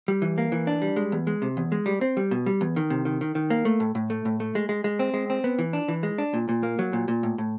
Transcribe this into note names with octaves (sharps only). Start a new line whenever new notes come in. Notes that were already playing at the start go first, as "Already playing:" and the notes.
G3
E3
A#3
E3
D4
G3
G#3
E2
G#3
C3
E2
G#3
G3
C4
G3
B2
G3
E2
D#3
C3
D#3
D#3
D#3
A#3
A3
A2
A2
A3
A2
A3
G#3
G#3
G#3
C4
G#3
C4
B3
E3
D4
E3
G#3
D4
A#2
A#2
A#3
F#3
A#2
A#2
A2
A2